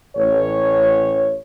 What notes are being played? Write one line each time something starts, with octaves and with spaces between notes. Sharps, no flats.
A1 C#5